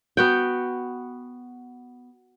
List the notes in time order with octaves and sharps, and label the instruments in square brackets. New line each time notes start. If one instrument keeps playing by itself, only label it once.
[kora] B3 F#4 G5